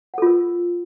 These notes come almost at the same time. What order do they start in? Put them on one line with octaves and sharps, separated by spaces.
F#5 A4 F4 A#4